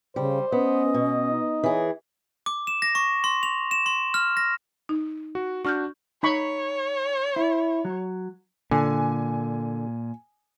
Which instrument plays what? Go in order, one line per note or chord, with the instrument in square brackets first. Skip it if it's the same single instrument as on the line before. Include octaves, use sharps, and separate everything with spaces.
[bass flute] C#3 [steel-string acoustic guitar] G3 [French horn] C5
[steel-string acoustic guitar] B3 [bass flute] C#4 [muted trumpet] D#5
[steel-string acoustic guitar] B2
[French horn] D#4
[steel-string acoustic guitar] E3 G#4 [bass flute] C#5
[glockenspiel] D6
E7
A#6
C#6
C6
F7
E7
C6
F6
A#6
[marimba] D#4
[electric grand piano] F#4
[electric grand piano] D4 F#4 [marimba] C#6 F6 G6
[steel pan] D#4 B5 C#6 [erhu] C#5
[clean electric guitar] E4
F#3
[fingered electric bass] A#2 [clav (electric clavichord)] D3 [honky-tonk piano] G#5